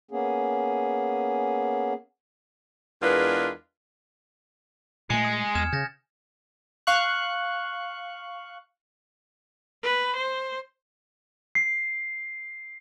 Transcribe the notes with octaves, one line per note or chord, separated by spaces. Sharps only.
A#3 B3 C#4 G#4
E2 G#3 D4 F4 A#4 B4
A#2 G#3 A3 G#5 C#7
D#6
E2 F6 G#6 E7
C#3 G6 A6 A#6
F5 C#6 F#6
B4
C5
C7